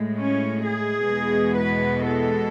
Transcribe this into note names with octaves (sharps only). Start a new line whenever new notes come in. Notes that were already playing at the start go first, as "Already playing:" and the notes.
Already playing: A2 G#3
C#4
G#4
E2 B2 G#3 B3
B4
A4